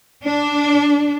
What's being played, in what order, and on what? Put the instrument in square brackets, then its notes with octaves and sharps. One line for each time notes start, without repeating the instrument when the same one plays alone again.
[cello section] D4